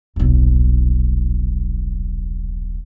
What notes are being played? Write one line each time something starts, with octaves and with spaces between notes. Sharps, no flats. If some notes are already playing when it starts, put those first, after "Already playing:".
D#1 B1